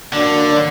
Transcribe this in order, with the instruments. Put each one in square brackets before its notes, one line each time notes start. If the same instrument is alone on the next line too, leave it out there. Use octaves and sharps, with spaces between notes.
[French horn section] F#2 F#3 A#3 D4 [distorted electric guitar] D3